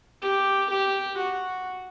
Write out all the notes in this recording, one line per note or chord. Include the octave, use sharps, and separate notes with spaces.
G4
G4
F#4